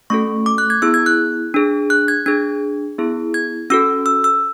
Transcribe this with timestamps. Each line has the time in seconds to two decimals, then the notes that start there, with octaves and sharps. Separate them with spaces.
0.10 A3 C#4 F#4 A4 C#6
0.46 D6
0.58 F#6
0.70 G#6
0.82 B3 E4 G#4 E6
0.94 G#6
1.06 F#6
1.54 D4 G#4
1.90 F#6
2.08 G#6
2.26 D4 G#4 G#6
2.98 B3 E4 G#4
3.34 G#6
3.70 C#4 F#4 A4 E6
4.06 E6
4.24 E6